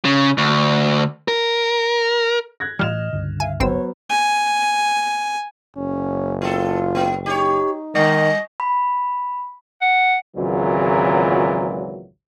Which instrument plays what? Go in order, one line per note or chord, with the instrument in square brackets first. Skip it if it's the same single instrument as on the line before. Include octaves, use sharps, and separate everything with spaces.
[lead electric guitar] C#3
D2
A#4
[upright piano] F#6 G#6 A#6
[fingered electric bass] A2 E3 [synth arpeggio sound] G3 F4 [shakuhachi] D#5 [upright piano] F6 E7 F7
[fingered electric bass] C#2 G2 D3
[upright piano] E5 [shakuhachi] F5 [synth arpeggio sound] G#5
[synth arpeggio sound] G#1 C4 E6 [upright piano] F#3 B3 C5 [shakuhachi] C#5
[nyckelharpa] G#5
[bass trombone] F#1 [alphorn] C#4
[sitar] B3 A4 [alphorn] F4
[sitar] B3
[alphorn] D#4 [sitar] G4 C5 C#5
[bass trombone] D#3 [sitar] G3 [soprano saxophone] D#5
[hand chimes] B5
[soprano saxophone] F#5
[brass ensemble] G#1 C#2 A#2 E3 F#3